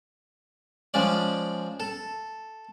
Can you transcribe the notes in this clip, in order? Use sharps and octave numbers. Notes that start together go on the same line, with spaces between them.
F3 G#3 C#4 D5
A4